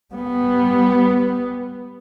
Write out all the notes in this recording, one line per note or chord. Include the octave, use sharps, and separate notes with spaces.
G3 B3